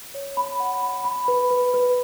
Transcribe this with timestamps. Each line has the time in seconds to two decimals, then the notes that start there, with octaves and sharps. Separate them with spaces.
0.14 C#5
0.37 B5
0.60 F#5
0.83 B5
1.05 B5
1.28 B4
1.51 B4
1.74 B4